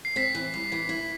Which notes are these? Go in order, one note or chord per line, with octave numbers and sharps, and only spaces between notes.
C7
C4 B6
E3
G3
E3
E4